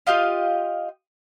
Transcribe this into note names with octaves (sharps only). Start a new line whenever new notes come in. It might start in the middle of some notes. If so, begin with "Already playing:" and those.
F4 G4 D#5 F5